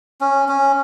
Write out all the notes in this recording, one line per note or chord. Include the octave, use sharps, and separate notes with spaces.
C#4
C#4